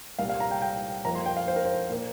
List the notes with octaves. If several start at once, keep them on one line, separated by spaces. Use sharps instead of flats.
C2 A#2 G3 A#3 F5
F5
A#5
G5
G5
F2 F3 A#3 A#5
C6
G5
F5
C5
A#4
C5
A#2 A#3